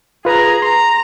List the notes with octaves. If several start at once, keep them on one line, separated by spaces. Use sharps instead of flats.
F4 G#4 B4 A#5
A#5 C6